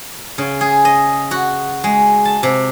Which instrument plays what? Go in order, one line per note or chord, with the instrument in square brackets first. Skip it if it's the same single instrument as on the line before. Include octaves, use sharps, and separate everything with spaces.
[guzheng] C#3
G#4
D#5
F#4
G#3
A5
C3